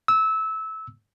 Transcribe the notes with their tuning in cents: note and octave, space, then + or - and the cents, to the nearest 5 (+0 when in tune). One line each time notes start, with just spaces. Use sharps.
E6 -20